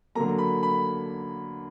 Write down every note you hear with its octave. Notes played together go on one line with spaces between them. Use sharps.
D3 F#3 A#3 A#5
B5
B5